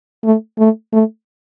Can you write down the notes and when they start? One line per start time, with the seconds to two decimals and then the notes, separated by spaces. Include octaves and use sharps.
0.24 A3
0.59 A3
0.93 A3